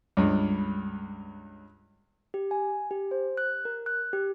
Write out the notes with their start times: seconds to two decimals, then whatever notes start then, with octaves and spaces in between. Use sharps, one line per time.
0.17 C#2 G2
2.34 G4
2.51 G#5
2.91 G4
3.11 C5
3.37 F#6
3.65 A#4
3.86 F#6
4.13 G4